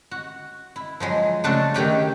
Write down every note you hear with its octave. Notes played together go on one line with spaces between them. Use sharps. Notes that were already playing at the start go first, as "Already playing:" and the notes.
F#4
E4
F3 F#3 G#3
C#3 A3 D4 F#4 A4
D#3 A3 G4 C#5